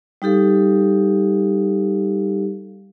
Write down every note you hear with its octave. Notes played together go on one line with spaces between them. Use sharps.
G3 D#4 G4 A4 F5